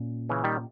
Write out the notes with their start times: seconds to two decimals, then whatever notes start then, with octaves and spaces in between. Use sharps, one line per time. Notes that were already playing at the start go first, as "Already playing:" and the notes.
Already playing: A#2 A#3 C#4
0.29 C#3 E3
0.44 D#3 G3